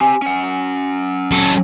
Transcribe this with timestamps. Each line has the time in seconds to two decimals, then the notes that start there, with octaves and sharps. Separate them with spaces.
0.01 C4 G4 G#5
0.22 C#4 F#5
1.32 F#3 A4